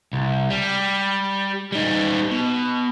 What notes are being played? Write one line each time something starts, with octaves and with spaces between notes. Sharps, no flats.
C2
G3
G3 D#4
B2